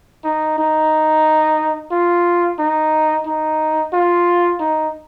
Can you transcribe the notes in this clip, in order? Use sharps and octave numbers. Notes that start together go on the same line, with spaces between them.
D#4
D#4
F4
D#4
D#4
F4
D#4